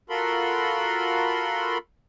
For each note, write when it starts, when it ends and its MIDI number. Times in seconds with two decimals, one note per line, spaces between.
0.10 1.78 65
0.10 1.78 66
0.10 1.78 69
0.10 1.78 70
0.10 1.78 83
0.10 1.78 84